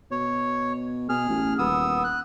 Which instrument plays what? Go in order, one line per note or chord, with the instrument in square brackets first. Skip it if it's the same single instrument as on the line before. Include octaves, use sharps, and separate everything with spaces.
[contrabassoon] B2 [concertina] C#5
[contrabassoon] B2 [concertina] G#4 F6
[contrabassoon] A1
[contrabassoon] D#1 [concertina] B3 D#6 E6
[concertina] F#6